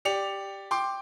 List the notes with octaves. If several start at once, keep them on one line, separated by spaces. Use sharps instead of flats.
G4 D5 C#7 F7
G5 C6 D6